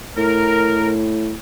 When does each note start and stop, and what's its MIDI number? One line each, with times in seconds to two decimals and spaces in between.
0.17 1.35 45
0.17 0.91 70